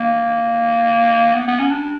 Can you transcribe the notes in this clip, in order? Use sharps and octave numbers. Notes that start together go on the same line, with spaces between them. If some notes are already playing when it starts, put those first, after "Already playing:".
Already playing: A#3
B3
B3
C#4
D4